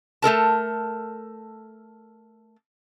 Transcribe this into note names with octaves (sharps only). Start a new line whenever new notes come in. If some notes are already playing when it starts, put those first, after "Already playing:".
A3 A4 A#4 A5